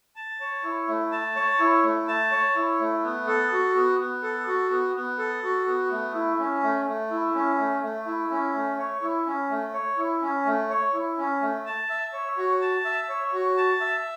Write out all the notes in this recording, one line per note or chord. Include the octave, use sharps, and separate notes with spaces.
A5
C#5
E4
A3
A5
C#5
E4
A3
A5
C#5
E4
A3
B3
A4
F#4
B3
B3
A4
F#4
B3
B3
A4
F#4
B3
A3
E4
C#4
A3
A3
E4
C#4
A3
A3
E4
C#4
A3
C#5
E4
C#4
A3
C#5
E4
C#4
A3
C#5
E4
C#4
A3
A5
E5
C#5
F#4
A5
E5
C#5
F#4
A5
E5